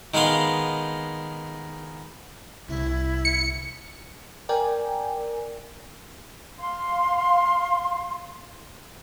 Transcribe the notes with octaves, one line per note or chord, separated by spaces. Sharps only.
D#3 G#3 B3 F5 C6
C2 D3 E4
C#7
A#4 D5 G5 G#5
F5 C6